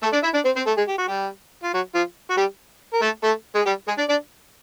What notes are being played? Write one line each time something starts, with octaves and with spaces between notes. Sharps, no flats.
A3 A4
D4 D5
E4 E5
D4 D5
C4 C5
C4 C5
A3 A4
G#3 G#4
G4
F#4
G3 G4
F4
F#3 F#4
F3 F4
F#4
G3 G4
A#4
A3 A4
A3 A4
G#3 G#4
G3 G4
G#3 G#4
D4 D5
D4 D5